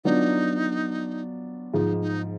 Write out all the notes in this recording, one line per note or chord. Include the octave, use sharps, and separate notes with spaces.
F#3 B3 D4 D#4 F4
G#2 F3 G#3 D#4
D#4